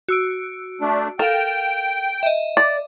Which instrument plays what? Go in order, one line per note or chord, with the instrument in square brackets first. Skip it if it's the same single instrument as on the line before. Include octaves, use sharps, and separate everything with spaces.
[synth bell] F#4 E6 D7
[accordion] A3 D4
[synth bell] A4 F5 [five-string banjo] A#4 [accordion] G5
[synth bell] D#5 E5
[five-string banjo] D5